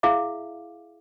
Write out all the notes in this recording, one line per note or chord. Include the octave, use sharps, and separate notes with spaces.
E4 G#4 E5 F5 D6